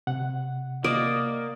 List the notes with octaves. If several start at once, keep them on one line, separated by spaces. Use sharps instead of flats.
C3 F#5
A#3 D5 D#5